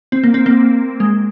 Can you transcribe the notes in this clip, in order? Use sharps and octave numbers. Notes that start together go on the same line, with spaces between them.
C4
A#3
C4
A#3
G#3